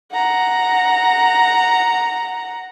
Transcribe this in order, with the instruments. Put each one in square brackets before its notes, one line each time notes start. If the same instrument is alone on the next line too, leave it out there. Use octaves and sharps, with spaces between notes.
[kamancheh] F#5 A#5